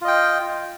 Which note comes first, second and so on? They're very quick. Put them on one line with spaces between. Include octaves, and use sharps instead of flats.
F4 D#5 G5